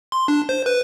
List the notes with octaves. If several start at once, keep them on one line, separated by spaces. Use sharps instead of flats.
C6
D4
C5
B4